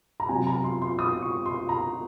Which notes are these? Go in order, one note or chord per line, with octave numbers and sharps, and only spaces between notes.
A#5
C3 F#3 G#5
A#5
C6
C6
D#6
C#6
C6
A#5